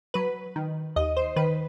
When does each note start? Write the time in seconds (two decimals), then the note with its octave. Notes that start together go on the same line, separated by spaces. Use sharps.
0.14 F#3 B4
0.56 D#3
0.96 D#2 D#5
1.17 C5
1.36 D#3 B4